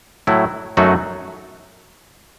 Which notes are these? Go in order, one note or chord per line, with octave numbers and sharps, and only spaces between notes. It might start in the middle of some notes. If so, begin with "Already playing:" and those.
A2 F#3 A3 E4
F#2 F#3 A3 D#4 F#4